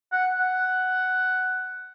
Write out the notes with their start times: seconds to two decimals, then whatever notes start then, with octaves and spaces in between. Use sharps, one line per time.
0.12 F#5
0.39 F#5